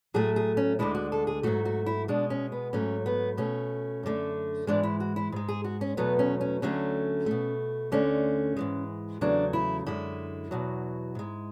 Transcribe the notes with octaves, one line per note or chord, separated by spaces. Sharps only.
A2 F#3 A3 G#4
G#4
C#4
D2 D3 G#3 E4
F#4
A4
G#4
G#2 F#3 A3 F#4
F#4
E4
B2 G#3 D4
C#4
B3
G#2 F#3 A3 C#4
B3
B2 A3 C#4
F#2 D3 A3
G#2 E3 G#3 D4
E4
F#4
E4
G#2 G#3
G#4
F#4
C#4
E2 B2 F#3 A3 B3
C#4
C#4
D2 D3 F#3 A3 C#4
B2 A3
D2 D3 A3 C#4
G#2 E3 G#3
E2 C#3 F#3 A3 D4
E4
F#2 D3 G#3 E4
E2 B2 F#3
G#2 G#3